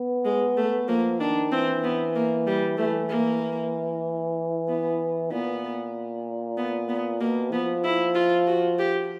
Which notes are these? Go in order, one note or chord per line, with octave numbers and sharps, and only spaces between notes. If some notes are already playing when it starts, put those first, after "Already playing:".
Already playing: B3
G#3
A3
F3 A#3
D#3 D4
E3 C4
B3
A#3
G3
E3 A3
A#3
B3
A#2 B3
B3
B3
B2 A#3
F3 B3
E4
F4
F#4
G4